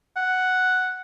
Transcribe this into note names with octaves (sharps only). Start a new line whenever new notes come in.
F#5